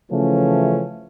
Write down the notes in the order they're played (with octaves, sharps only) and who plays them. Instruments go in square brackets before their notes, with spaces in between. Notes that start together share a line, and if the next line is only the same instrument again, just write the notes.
[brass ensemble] C#3 E3 F3 A3 C#4